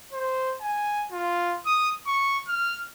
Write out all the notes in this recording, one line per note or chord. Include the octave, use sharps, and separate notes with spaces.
C5
G#5
F4
D#6
C#6
F6